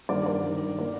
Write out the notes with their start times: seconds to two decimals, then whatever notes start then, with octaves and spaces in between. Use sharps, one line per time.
0.09 G2 D#3 A#4 D5
0.26 A#4 D5
0.43 G2
0.48 D#3
0.79 A2 A#4 D5